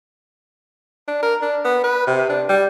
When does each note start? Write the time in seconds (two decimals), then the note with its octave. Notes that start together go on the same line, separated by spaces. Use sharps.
1.08 D4
1.23 A#4
1.42 D4
1.65 B3
1.84 B4
2.07 C3
2.29 D4
2.49 G3